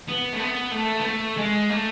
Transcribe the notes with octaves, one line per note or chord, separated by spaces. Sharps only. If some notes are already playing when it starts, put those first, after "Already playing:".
B3
A3
B3
A3
B3
A3
G#3
A3